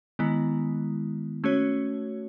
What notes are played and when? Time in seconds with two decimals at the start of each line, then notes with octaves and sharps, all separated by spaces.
0.19 D#3 G#3 B3 E4
1.44 A3 C#4 F#4 C#5